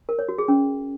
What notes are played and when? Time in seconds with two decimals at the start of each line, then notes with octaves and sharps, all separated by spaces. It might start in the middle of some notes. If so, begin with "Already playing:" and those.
0.09 A#4
0.19 C#5
0.29 F#4
0.38 G#4
0.48 C#4